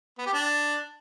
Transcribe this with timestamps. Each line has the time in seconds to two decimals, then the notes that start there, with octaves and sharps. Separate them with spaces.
0.18 B3
0.26 G4
0.34 D4